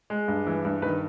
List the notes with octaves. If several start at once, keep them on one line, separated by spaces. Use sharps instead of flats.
G#3
G2
E3
G2
D#3 B4